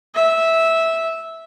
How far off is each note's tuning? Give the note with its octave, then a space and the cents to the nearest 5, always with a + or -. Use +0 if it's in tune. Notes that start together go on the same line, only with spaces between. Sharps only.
E5 -10